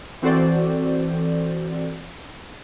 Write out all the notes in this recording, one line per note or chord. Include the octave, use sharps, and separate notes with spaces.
E3 C4 F#4 A4 C5 D5